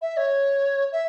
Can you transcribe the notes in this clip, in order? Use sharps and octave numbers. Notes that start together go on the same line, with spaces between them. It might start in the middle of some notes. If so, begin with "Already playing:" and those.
E5
C#5
E5